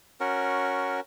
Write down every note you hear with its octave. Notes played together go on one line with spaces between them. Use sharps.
C#4 F#4 A#4